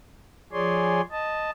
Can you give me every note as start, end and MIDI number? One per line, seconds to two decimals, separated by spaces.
0.53 1.01 53
0.53 1.01 68
0.53 1.01 73
0.53 1.01 74
0.53 1.01 80
0.53 1.01 84
1.12 1.51 75
1.12 1.51 81